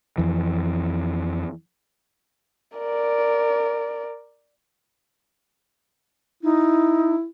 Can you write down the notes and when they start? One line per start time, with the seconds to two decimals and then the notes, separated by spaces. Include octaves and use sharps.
0.18 F2 E3
2.78 A#4 D5
6.43 D#4 E4